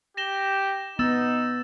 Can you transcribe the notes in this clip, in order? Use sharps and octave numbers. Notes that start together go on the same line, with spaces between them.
G4 A#6 E7 G7
B3 D#4 E6 A6 E7